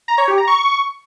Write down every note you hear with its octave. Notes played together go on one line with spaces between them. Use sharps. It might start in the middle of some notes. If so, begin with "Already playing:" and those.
A#5
C#5
G4
A#5
C#6